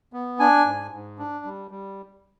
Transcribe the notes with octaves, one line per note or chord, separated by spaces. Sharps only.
B3
D4 G#5
G#2
G#2
D4
G3
G3